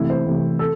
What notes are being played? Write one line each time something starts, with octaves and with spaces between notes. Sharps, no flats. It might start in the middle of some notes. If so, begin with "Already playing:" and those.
Already playing: C3 E3 A3 E4
C5
C3 E3 A3
A4